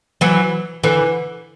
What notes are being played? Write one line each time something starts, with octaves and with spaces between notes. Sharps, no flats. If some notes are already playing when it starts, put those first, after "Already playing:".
E3 F#3
D3 E3